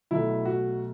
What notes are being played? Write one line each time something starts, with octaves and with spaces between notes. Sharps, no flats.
B1 B2 A3 E4
F#4